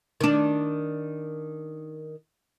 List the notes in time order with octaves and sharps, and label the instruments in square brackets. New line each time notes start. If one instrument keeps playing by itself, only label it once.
[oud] D#3 D4